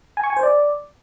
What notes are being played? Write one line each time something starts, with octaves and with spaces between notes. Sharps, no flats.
G#5
C#6
G#5
C5
D5